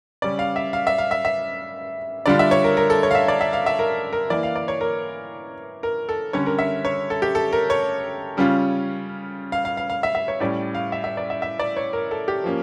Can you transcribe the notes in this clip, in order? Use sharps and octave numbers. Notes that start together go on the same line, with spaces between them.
C#3 G3 C#4 D5
F5
E5
F5
E5
F5
E5
E5
D3 G3 D4 F4 D5
E5
C#5
A#4
A#4
A4
C#5
F5
E5
D5
E5
F5
E5
A#4
A#4
E3 A#3 E4 D5
F5
D5
C#5
A#4
A#4
A4
D3 G3 C#4 C#5
A#4
E5
C#5
A4
G4
A4
A#4
C#5
C#3 G3 C#4 F4
F5
F5
F5
F5
E5
E5
C#5
A2 G3 C#4 D5
F5
E5
E5
D5
E5
E5
D5
C#5
A#4
A4
G4
F3 A#3 C#4